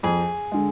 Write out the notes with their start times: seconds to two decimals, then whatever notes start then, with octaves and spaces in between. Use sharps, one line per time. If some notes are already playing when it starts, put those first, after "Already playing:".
0.03 F2 G#4
0.52 D3 G#3